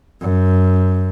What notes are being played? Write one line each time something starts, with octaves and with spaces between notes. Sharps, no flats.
F#2